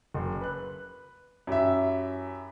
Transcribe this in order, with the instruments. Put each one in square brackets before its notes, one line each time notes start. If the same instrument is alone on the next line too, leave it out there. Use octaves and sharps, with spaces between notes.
[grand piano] F#1 C6
B4 F#6
[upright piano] F#2 E5 [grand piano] E4 G4